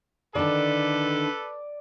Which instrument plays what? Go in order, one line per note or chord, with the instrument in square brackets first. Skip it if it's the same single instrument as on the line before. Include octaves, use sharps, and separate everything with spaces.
[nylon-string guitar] D3 D#3 [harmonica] A4 B4 [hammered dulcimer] D5